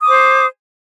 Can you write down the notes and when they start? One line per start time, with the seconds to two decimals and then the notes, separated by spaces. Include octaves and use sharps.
0.01 D#6
0.04 D6
0.06 C5